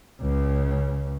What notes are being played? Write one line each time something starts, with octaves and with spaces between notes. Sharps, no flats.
C#2 C#3